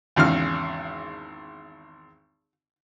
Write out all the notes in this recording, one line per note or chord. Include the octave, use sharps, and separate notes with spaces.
G#1 E2 C#3 F6